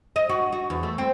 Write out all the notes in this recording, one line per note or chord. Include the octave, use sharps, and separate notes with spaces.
D#5
F#4
F#4
E2
A3
C4